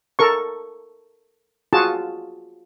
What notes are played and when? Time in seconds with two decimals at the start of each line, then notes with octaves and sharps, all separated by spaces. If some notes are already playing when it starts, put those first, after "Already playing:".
0.19 A4 A#4 C#6
1.73 F4 F#4 G#4 A5